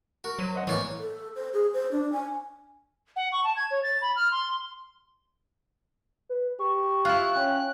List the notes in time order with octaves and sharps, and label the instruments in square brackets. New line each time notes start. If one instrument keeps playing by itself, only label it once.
[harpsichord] F#4 [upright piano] A#4
[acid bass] F#3 [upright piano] C5 D#7
[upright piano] C5 D#5 F#5
[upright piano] A2 A#3 B3 [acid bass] E3 [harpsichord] C#5 D5 C#6
[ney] A4
C5
G#4
C5
D4
G#5
[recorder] F#5
C#6
A5
G#6
C#5
A6
B5
F6
C6
[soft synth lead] B4
[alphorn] G4 [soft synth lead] C#6
[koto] E4 F4 [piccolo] F#6
[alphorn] C#4 [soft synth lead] G5